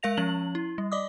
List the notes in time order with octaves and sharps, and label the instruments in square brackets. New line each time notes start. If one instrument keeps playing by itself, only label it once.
[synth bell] G#3 A#4 F5 A#6 F7
F3 C#4 F#7
E4
G3
D5 D#5 D6 D#6